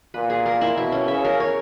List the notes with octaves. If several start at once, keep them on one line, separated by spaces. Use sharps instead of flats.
A#2 B4
G#4
A#4
E4
B2 E4
C#4
C#3 E5
A#4
C#5